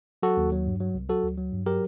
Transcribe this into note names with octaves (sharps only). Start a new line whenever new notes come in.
F#3 F#4 A4
D#2
F#3
G2
F#3
C2
F#3 F#4 A4
D2
F#3
G2
F#3 G4 A#4